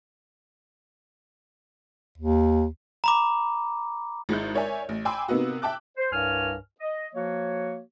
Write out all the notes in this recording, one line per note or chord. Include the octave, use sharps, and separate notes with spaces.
D#2
A#5 B5 D6
G#1 G#3 E4 G6
A#4 C#5 D5 E5 G#5
A1
G5 G#5 B5 C6 D6 E6
C3 A#3 B3 D#4 F#4
E5 G5 A5 D6 F#6
C5
C2 G2 A#4 C#5 G#5 F6
D#5
F3 A#3 F#4 C#5